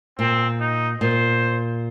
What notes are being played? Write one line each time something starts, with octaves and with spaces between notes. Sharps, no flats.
A#2 C4
D#4
A#2 C5